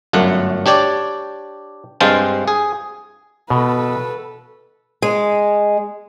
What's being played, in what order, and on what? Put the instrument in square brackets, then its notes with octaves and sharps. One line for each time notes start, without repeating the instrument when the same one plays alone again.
[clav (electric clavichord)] G1 F#2 A3 F#5
D4 G4 C#5 D5
G2 G#3 C4 F5 G5 A5
G#4
[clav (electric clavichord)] B2 [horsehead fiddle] A4 B4
[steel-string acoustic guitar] G#3